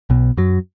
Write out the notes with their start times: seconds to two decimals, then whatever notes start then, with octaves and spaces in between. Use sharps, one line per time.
0.10 B1 B2
0.37 F#2 F#3